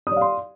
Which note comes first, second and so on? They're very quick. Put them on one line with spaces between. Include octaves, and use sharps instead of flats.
D#6 D5 F5 C6